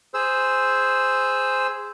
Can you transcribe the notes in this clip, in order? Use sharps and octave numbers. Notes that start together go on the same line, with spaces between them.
G#4 C5 E6